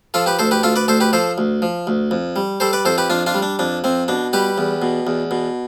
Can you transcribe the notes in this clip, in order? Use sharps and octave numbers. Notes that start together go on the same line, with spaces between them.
F3 F4 A4
G4 B4
D2 A4 C5
G4 B4
D2 F4 A4
B4 D5
D2 A4 C5
G4 B4
F3 A4 C5
D2
F3
D2
F2
G3
G3 A4 C5
B4 D5
F2 A4 C5
G4 B4
F2 D4 F4
D4 F4
G3
D4
F2 D4
F2 C4
B2 D4
G3 G4 B4
E2
B2
E2
B2